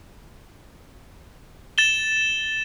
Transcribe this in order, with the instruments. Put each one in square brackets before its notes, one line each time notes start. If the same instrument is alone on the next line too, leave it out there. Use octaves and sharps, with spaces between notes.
[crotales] A6 E7 G7